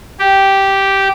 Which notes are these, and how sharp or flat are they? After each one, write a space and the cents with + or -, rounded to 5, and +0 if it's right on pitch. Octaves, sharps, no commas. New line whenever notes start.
G4 -5